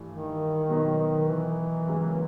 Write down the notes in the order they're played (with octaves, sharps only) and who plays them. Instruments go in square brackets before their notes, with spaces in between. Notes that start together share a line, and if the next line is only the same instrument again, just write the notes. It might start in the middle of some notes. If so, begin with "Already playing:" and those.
Already playing: [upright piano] G2 E3 A3
[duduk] D#3
[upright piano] B2 F#3 B3 D#4
[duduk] D#3
E3
[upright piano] C#2 C#3 F#3 A#3